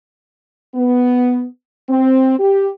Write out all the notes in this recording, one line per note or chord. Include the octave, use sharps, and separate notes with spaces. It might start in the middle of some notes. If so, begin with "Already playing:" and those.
B3
C4
G4